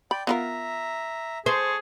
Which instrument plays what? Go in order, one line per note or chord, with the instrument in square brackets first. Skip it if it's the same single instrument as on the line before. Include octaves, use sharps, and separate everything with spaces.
[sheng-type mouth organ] D5 G5 [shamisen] B5
[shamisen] B3 F4 A#4 [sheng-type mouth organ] E5 A#5
[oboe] G#4 [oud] C5 [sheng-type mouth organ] A5 C#6